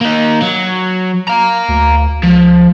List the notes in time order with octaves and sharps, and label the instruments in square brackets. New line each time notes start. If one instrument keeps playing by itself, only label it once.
[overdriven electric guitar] A#3 D#4
F#3
F5 A#5
[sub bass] D2
[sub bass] C#2 [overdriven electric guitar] F3